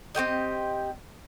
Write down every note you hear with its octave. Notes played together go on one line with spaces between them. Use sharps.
C4 F#4 G4 D#5